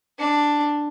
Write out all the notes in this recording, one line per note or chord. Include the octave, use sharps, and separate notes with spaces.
D4